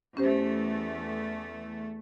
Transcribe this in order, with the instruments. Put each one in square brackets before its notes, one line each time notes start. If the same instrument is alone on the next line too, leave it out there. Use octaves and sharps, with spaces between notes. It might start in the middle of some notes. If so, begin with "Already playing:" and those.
[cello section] E2 A3 [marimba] C#4 G4 C5